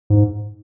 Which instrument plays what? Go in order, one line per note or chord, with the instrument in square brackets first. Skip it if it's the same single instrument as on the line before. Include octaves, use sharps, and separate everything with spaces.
[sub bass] G#2